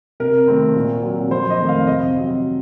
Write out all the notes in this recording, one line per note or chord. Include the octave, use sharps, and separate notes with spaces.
C3 A#4
D#3 A3 C4
A#2
F#3 C4
F2 C5
D#5
D#3 A3 C4
F5
C3 D#5
F#3 C4